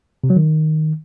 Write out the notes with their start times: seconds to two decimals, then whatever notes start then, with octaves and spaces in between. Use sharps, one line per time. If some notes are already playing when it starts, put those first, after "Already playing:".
0.24 C3
0.30 F#3
0.36 D#3